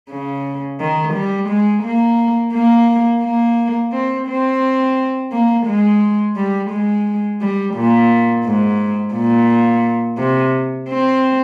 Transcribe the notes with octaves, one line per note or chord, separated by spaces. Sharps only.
C#3
D#3
G3
G#3
A#3
A#3
A#3
C4
C4
A#3
G#3
G3
G#3
G3
A#2
G#2
A#2
C3
C4